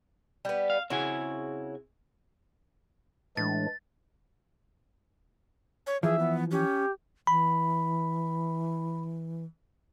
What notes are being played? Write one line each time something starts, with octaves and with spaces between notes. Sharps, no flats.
G3 B3
F5
C#3 C4 E4 F#4 G#5
A2 E3 G#3 D4 A6
C#5
E3 F3 G#4 E5
B3
C#4 G4
E3 B5